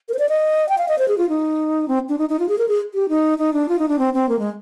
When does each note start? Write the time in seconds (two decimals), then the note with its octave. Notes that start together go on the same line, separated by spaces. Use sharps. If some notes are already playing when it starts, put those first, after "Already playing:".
0.09 A#4
0.14 C5
0.19 D5
0.29 D#5
0.69 G5
0.78 F5
0.88 D#5
0.99 C5
1.08 G#4
1.18 F4
1.29 D#4
1.88 C4
2.09 D4
2.19 D#4
2.29 D#4
2.39 F4
2.49 G#4
2.58 A#4
2.68 G#4
2.94 G4
3.09 D#4
3.38 D#4
3.53 D4
3.69 F4
3.79 D#4
3.88 D4
3.99 C4
4.14 C4
4.29 A#3
4.39 G#3